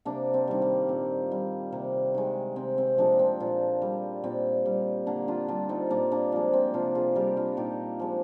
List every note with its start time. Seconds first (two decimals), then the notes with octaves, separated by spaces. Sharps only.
0.05 C3 A#3 D4
0.34 C4
0.48 D#3 G3
0.62 A#3
0.89 A#2 C4
1.32 G3
1.72 C3 A#3
2.14 D#3 G#3
2.56 C3 C4
2.78 C4
2.98 F3 G#3 A#3 D4
3.19 C4
3.40 A#2
3.82 G3
4.24 A#2 C4
4.65 G3
5.07 D3 A#3 D4
5.28 D4 F4
5.48 G3 D4 F4
5.69 C4 D#4
5.90 A#2 A#3 D4
6.12 A#3 D4
6.32 F3 G#3 A#3
6.53 C4
6.74 C3 D4 F4
6.95 F4 G#4
7.15 G3 G4 A#4
7.37 D4 F4
7.57 A#2 D#4 G4
8.00 F3 G#3